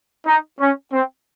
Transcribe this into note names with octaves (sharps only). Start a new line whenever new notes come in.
D#4
C#4
C4